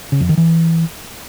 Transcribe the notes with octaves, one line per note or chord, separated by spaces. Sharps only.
C#3
F2
D#3
E3